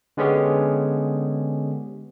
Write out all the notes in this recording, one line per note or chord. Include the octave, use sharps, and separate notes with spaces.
D3 G#3 B3 C#4 G4 G#4